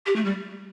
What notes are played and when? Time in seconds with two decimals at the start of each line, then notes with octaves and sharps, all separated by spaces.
0.06 G4
0.16 A3
0.24 G3